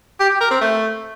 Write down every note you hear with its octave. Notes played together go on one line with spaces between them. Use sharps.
G4
G4
A#4
C4
A3